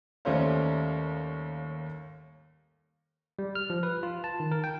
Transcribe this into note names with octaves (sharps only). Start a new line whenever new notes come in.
D#2 G3 A3 C#4 C5 F5
G3
F6
F3
B4
F4
A5
D#3
A#4
G5